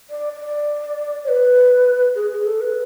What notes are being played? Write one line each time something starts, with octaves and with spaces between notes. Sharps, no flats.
D5
D5
C#5
B4
G#4
G#4
A4
B4